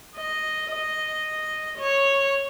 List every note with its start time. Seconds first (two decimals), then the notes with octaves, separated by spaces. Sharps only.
0.15 D#5
0.70 D#5
1.79 C#5